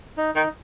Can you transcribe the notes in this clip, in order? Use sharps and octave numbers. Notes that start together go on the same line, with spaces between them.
D#4
D#3 D#4